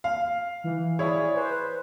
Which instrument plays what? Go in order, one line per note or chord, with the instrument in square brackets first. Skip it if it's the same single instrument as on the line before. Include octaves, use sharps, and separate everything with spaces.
[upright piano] F5
[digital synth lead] E3
[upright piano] E4 C#5 [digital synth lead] G#4 [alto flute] D5
[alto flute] B4 [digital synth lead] C5